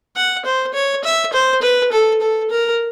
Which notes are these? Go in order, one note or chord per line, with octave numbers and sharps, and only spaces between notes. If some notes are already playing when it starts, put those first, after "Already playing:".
F#5
C5
C#5
E5
C5
B4
A4
A4
A#4